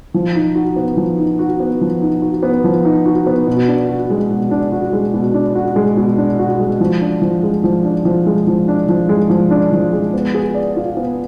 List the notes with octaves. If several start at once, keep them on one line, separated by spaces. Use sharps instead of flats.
F3
D#4
F#4
B3
F3
D#4
F#4
B3
F3
D#4
F#4
B3
F3
D#4
F#4
B3
B2
D4
F#4
G#3
B2
D4
F#4
G#3
B2
D4
F#4
G#3
B2
D4
F#4
G#3
F3
D4
F3
G#3
F3
D4
F3
G#3
F3
D4
F3
G#3
F3
D4
F3
G#3
B3
G#4
D5
F4
B3